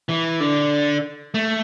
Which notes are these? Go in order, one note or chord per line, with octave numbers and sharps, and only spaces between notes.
E3
D3
A3